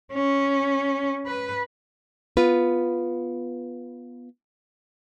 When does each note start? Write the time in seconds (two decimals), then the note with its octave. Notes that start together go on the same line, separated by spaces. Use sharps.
0.13 C#4
1.26 B4
2.37 B3 F4 B4